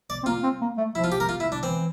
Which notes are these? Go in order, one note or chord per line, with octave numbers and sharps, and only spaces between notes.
D5
C4
A#3 F4
C4
A#3
A3
F3 E4
F4
G4
A#4
F4
E4
D4
E3 C4